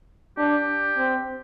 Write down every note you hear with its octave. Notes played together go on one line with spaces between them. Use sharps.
D4 G4
C4